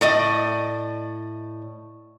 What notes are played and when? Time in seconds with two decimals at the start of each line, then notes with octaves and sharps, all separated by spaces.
0.01 A2 D5 D#5